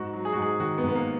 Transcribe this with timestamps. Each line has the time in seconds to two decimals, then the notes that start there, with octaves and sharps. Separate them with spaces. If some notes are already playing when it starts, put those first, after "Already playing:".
Already playing: G#2 F#4
0.13 F#3
0.25 G#4
0.33 F#4
0.36 G#2
0.42 G#4
0.60 D#3 F#4
0.78 B3
0.83 G#2
0.88 B3
0.95 A#3